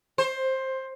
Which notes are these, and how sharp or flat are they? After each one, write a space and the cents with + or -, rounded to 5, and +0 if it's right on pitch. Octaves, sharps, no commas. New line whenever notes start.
C5 +15